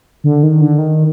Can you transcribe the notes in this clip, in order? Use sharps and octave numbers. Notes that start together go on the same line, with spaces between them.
D3
D#3
D3
D#3